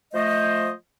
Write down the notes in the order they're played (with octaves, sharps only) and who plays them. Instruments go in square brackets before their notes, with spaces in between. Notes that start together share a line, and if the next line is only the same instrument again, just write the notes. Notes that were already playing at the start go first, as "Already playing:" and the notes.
[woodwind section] F3 A3 C5 D#5